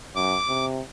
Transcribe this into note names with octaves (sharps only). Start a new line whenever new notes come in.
F#2 D6
C3